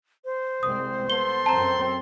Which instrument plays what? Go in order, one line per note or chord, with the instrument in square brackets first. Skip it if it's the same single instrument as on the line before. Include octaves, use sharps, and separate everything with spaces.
[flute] C5
[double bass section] C2 G#3 C4 [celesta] D#6
[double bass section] B3 [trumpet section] A4 C6 [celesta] G7
[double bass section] F#2 C4 [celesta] A5 A#5